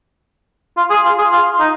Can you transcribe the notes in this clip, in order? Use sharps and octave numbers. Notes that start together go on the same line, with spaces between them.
F4
G#4
F4
G#4
F4
D#4